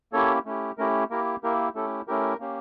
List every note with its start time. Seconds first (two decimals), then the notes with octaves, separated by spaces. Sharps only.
0.13 A#3 C#4 E4 G4 A4 C#5
0.46 A3 C#4 E4 G4
0.78 A3 C#4 E4 G4 A#4
1.10 A#3 E4 G4 A#4
1.43 A#3 E4 G4 A#4
1.75 A3 C#4 E4 G4 A4
2.08 A3 C#4 E4 G4 A#4
2.40 A#3 C#4 G4